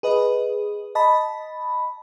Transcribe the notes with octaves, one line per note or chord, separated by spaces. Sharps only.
G#4 B4 D#5
D#5 A5 B5